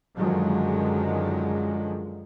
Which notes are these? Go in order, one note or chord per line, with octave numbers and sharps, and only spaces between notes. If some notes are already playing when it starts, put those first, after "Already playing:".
F#2 D3 D#3 F3 F#3 G#3